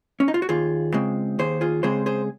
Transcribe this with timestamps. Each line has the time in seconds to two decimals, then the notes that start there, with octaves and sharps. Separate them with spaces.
0.20 C#4
0.28 D#4
0.34 F4
0.42 F#4
0.49 D#2 F4 G#4
0.94 C#3 G#3 C4
1.39 D#2 G#4 C5
1.61 F4 G#4
1.83 C#3 G#3 C4 G#4 C5
2.06 G#4 C5